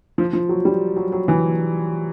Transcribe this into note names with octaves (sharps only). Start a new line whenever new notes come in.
F3
F3
F#3
G3
F#3
F#3
E3